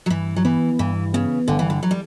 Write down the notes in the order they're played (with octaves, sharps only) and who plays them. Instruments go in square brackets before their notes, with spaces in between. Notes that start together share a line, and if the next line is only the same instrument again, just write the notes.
[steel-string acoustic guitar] F#3
[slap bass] G2 [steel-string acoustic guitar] E3
[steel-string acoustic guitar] F#3
[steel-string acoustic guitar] E3 [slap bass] B3
[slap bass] G2 [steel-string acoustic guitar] E3
[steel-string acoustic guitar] C#3 [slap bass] B3
[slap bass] G1 [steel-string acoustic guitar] D3
[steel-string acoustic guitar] E3
D3
F#3
G3